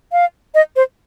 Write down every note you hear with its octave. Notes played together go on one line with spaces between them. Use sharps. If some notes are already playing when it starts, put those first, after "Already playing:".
F5
D#5
C5